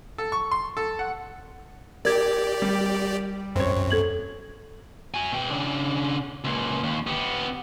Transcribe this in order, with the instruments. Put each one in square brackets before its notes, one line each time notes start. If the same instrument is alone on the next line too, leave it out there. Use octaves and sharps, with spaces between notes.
[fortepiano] A4
C#6
C6
A4
F#5
[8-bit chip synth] G4 D5 [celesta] A#4 G#6
[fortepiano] G3
[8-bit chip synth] F#2 [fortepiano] C4 C#5
[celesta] A4 G#6 F#7
[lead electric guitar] F#4 G#5
B2 G5
C#3 D4
C#2 A#2
D#2
B3 G4